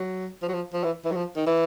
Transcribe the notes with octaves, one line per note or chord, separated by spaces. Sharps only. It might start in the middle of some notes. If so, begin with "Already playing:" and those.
Already playing: F#3
F3
F#3
F3
F3
E3
E3
F#3
F3
D#3
E3